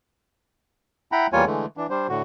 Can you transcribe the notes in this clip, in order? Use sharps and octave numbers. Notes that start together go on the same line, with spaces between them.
E4 F#5 G5 A#5 B5
E2 G3 A#3 F4 C#5 G#5
D3 E3 G#3 A3
E3 D4
G3 D4 C5
A2 D3 F#4